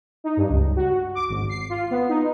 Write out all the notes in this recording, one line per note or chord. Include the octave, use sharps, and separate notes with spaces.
D#4
G2
C#2
F#4
D6
G#1
C7
F4
B3
D#4